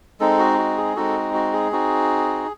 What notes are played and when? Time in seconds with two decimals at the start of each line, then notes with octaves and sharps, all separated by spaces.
0.20 G#3 C4 D#4 A4
0.39 F#4
0.58 F#4
0.77 G#4
0.96 G#3 C4 D#4 F#4 A4
1.34 F#4
1.53 G#4
1.72 C4 D#4 F#4